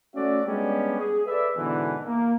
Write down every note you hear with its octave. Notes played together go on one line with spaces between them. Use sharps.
A3 C#4 F#4 D5 E5
G3 G#3 B3 C#4 D4 G4
G#4
A4 B4 D5 E5
G#2 B2 D3 E3
A#3